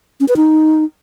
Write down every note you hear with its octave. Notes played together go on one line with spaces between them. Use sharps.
C#4
B4
D#4